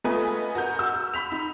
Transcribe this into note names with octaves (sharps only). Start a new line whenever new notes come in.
A3 B3 F4 B4 D#5 G#5
F#4 A#4 A#5 G6
E6
B5 B6 F7
D#4